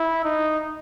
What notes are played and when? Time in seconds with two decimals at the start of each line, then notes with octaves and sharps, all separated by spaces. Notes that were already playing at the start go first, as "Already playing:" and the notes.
Already playing: E4
0.24 D#4